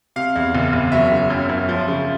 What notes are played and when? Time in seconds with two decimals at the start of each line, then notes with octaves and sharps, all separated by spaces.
0.16 C3 F5
0.36 E2
0.55 F#1
0.73 F#1
0.92 F#3 E5
1.11 C#3
1.30 F#2
1.49 F#2
1.69 F3
1.88 C#3